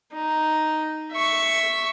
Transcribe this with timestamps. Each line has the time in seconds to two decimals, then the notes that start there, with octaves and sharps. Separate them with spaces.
0.13 D#4
1.13 E5 C#6